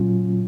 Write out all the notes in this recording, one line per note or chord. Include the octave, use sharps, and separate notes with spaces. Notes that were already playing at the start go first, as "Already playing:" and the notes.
Already playing: A#2 F#3 C#4 F4